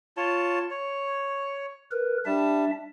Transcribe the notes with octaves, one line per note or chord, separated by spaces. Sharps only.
F4 C#5 A5
C#5
A#4 B4
G3 D4 E5 A5